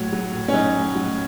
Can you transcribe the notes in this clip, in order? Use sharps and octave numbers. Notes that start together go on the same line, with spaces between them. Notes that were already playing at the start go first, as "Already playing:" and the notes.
Already playing: A2 F#3 C#5
F#3
A2
C#4
F#3 D#4
A2
F#3